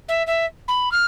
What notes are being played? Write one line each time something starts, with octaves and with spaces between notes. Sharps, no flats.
E5
E5
B5
F6